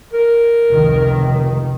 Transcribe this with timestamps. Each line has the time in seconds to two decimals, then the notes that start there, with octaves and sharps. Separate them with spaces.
0.13 A#4
0.70 F1 C#2 D#3